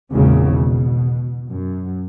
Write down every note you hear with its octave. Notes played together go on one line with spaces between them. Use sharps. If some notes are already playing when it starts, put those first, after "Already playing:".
G#1 E2 A#2 C#3
B2
F#2